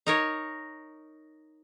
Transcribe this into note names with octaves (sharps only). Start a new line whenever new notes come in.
D#4 A#4 C#5